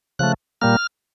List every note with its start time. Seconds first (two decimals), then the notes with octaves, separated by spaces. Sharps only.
0.19 C#3 F3 A3 F#6
0.61 A#2 G3 A#3 F6